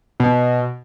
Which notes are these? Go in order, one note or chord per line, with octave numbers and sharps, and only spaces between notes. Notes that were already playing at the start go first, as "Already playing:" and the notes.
B2